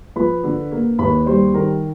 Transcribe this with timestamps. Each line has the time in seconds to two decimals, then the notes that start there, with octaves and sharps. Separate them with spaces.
0.16 F3 B4 B5
0.44 D3
0.72 A#3
0.99 D#2 B4 B5
1.26 G3 C5 C6
1.54 D#3 A#4 A#5